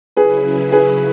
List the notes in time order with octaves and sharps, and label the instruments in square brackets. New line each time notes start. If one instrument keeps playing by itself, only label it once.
[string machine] C#3 F#3 C#4 E4 [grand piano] G#4 B4
[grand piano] G#4 B4